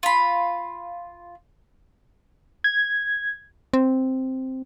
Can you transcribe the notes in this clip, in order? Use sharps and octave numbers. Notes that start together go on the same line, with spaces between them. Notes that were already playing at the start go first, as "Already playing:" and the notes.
F4 B5
G#6
C4